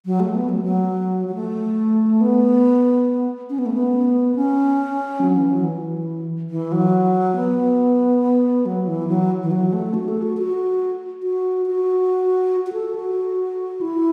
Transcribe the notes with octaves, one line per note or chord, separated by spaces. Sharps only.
F#3
A3
B3
F#3
A3
F#3
F#3
A3
B3
C#4
B3
A3
B3
C#4
F#3
E3
F#3
E3
E3
F#3
B3
F#3
E3
F#3
E3
F#3
A3
F#4
A4
F#4
F#4
F#4
F#4
F#4
A4
F#4
E4